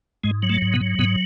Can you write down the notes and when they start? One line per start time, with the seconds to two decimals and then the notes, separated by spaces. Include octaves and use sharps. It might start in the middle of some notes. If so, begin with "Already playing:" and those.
0.24 G#2 G#3
0.42 F#3
0.49 A3
0.62 G#2
0.73 B2 B3
0.80 F#3
0.99 G#2 B2 B3